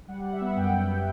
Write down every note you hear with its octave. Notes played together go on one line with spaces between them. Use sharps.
G3 F#5
G3 F#5
E5
B3 F#5
F#2 G5
B3